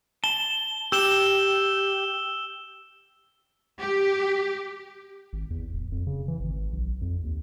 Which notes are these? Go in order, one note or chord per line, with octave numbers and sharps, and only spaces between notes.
A5 G7
G4 E6 E7 G7
G4
G#1
E2
D1
F2
C#3
E3
G#1
B1
F2
D#2